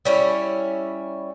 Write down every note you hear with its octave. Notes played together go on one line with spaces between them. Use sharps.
G3 C#4 E4